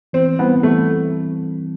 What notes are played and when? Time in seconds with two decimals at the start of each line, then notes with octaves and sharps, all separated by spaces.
0.13 E3 C4
0.39 G3 B3 C4 E4
0.63 E3 A3